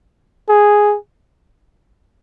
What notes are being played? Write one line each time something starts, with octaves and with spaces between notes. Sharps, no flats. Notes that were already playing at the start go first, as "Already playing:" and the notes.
G#4